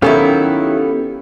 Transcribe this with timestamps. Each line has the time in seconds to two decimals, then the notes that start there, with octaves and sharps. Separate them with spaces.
0.02 D#3 F#3 B3 C#4 E4 G4 A4 F5